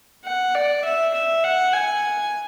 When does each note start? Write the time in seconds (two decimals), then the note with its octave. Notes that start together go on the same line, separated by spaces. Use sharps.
0.25 F#5
0.55 D5
0.84 E5
1.14 E5
1.44 F#5
1.73 G#5